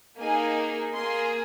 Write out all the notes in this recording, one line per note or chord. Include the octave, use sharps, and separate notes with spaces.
A#3 D#4 G#4 G#5
A#3 G#4 C6